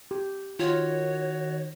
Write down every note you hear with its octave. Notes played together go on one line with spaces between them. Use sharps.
G4
D#3 F4 F#4 C#5